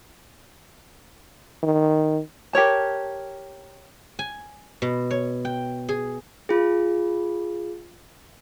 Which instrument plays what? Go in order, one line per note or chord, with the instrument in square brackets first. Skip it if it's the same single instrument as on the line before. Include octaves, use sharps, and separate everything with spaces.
[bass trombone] D#3
[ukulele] G4 A#4 C#5 A5
[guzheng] G#5
B2
C#5
G5
G#4
[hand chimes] F4 G#4